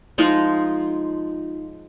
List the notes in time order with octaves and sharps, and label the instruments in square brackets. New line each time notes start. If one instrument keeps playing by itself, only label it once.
[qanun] F3 G#3 D#4 F4